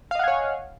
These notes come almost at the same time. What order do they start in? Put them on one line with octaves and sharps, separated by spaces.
F5 D#5 F#5 G#5 C#5